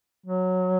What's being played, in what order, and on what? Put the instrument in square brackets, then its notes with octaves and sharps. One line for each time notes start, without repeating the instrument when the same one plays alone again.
[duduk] F#3